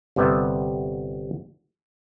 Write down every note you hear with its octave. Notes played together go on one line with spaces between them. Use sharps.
G1 C3 G3 B3 D#5 E5